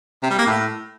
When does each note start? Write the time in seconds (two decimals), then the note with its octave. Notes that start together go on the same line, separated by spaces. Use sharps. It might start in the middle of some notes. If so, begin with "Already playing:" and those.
0.23 C3
0.31 G3
0.39 A#3
0.47 A2